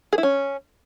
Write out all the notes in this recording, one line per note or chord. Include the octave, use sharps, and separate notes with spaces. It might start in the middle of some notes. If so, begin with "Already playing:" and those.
G#4
E4
C#4